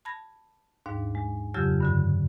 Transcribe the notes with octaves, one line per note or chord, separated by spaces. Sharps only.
A5 B5 G#6 A#6
D#2 G#2 D4 F5
G#3
F2 C#3 F#3 F4 G4 E6
G2 D3 F#4